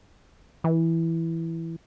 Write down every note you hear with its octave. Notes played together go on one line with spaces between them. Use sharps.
E3